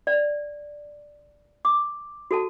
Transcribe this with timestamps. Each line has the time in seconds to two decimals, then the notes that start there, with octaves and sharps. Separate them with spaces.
0.07 D5
1.65 D6
2.31 F#4 A4 A5